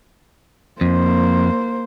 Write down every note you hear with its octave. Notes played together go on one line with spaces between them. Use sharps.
F2 A#3 C5